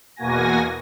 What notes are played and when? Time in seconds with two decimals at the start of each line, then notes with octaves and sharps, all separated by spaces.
0.16 E2 B2 A#3 F#4 G#5 A#6